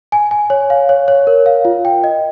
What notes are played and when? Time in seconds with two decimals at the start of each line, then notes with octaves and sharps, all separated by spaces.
0.12 G#5
0.31 G#5
0.50 C#5
0.70 F5
0.89 C#5
1.08 C#5
1.27 A#4
1.46 F5
1.65 F4
1.85 G5
2.04 D#5